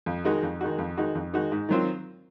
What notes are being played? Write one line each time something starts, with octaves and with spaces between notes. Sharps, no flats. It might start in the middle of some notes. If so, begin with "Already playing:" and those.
F2
D#3 G#3 D#4 F#4
F2
D#3 G#3 D#4 F#4
F2
D#3 G#3 D#4 F#4
F2
D#3 G#3 D#4 F#4
G#2
D#3 F#3 C4 F4